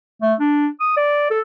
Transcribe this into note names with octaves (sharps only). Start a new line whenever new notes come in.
A3
D4
D#6
D5
A4